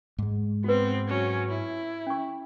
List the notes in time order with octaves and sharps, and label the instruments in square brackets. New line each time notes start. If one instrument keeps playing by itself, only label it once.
[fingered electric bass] G#2 G#3
[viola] B3 C4 [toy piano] F#4 B4
[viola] F#3 C#4
E4
[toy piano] C#4 C#6